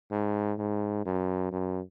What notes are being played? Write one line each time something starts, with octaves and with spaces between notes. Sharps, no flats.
G#2
G#2
F#2
F#2